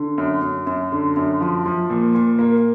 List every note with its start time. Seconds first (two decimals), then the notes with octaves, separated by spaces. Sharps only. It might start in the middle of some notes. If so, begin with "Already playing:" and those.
Already playing: D3
0.18 F#2
0.42 F#2
0.67 F#2
0.92 D3
1.17 F#2
1.41 F3
1.66 F3
1.90 A#2
2.15 A#2
2.39 A#3